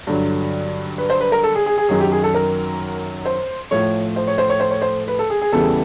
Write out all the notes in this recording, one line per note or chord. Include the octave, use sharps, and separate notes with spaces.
G2 D3 F#3
B4
C5
B4
A#4
A4
G#4
G#4
G#4
F#2 D#3 F#3 G#4
G4
G#4
A4
A#4
C5
A2 F3 A3 C#5
C5
C#5
C5
C#5
C5
C#5
C5
B4
A4
G#4
G#4
E2 C#3 E3 G3 A4